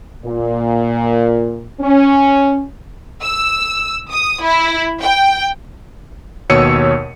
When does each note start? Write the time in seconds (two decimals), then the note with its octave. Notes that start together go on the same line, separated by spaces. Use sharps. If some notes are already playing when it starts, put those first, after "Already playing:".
0.25 A#2
1.81 C#4
3.23 E6
4.11 D#6
4.43 E4
5.01 G5
6.50 D#2 B2 C#5 E6 C#7 D#7